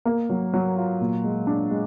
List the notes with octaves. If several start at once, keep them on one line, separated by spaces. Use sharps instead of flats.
A#3
F#3
F#3
F4
A#2
G#3
D4
G#3